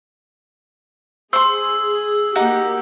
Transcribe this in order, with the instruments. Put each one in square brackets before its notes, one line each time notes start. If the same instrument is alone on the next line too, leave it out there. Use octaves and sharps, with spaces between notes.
[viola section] G#4 [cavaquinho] C5 C6 [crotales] E6
[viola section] A#3 F#4 G4 [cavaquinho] D#4 F#5